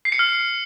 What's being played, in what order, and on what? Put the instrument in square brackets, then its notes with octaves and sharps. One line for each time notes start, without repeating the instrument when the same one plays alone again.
[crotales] C7
C#7
F6